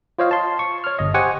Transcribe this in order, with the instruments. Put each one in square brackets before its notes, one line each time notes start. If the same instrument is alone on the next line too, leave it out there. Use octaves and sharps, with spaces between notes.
[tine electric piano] F4 C5 C#5 D#5 F5
A5 C6
C#6
C#5 F6
G1 D#5
G4 C5 F#5 G#5 C#6